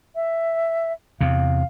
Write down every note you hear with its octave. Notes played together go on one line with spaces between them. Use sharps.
E5
E2 C3 F5